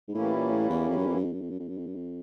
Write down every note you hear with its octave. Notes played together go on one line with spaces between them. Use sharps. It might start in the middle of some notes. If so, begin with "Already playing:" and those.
G#2
A2 E3 G3 A#3 C#4 E4
A#2
A2
E2
F2
F#2
F2
F#2
F2
F#2
F2
F#2
F2
F#2
F2
F#2
F2